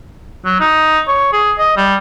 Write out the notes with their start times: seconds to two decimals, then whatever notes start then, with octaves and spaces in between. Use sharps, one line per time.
0.45 F#3
0.60 D#4
1.07 C#5
1.32 G#4
1.58 D#5
1.77 G3